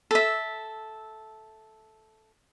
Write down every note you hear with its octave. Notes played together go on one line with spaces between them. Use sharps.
A4 E5